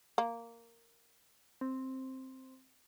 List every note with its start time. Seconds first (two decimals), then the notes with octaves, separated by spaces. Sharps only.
0.18 A#3
1.61 C4